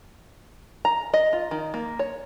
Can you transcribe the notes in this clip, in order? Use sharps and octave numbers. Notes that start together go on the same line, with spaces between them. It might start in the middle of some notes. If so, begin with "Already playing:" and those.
A#5
D#5
F4
D#3
A#3
C#5